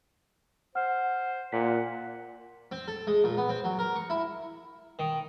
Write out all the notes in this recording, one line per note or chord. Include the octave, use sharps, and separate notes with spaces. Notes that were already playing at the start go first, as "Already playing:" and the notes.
C5 F#5 F6
A#2 F#5 B6
C4
A4
G#3
A#2
B3
C4
F#3
A#4
C#6
E4
D#3